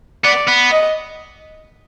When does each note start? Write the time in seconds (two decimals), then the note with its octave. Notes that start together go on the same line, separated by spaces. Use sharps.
0.25 B3 D5
0.48 B3
0.72 D#5